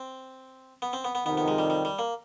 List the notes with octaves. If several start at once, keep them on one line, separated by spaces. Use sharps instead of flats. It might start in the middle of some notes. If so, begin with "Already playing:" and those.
Already playing: C4
B3
C4
B3
B3
F2 C3 D#3 B3
B3
G#3
G3
G3
G3
A#3